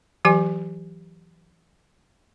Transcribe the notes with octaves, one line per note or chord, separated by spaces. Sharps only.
E3 F#3 G4 G#5